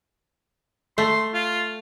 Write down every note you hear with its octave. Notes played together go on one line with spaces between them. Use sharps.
A3 C6
F4